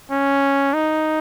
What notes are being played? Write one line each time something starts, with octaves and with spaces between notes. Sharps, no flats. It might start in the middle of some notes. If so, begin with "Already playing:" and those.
C#4
D#4